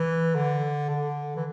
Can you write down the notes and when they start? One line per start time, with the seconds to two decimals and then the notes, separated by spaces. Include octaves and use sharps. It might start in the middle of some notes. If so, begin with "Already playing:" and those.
Already playing: E3
0.35 D3
0.89 D3
1.36 E3